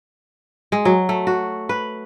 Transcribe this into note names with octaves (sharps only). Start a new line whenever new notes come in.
G#3
F#3
A3
F#4
B4